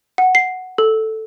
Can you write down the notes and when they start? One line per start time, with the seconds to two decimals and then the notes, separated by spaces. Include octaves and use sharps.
0.18 F#5
0.35 C7
0.78 A4